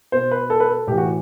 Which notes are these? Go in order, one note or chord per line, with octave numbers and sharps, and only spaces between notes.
B2 C5
B4
A4
B4
A4
A2 E3 G4
F#4